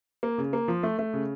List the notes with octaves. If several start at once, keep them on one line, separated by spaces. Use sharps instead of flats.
A#3
C#3
A#3
F3
A3
A3
C#3